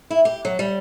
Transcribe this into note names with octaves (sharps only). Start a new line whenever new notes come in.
E4
G4
F#3
G3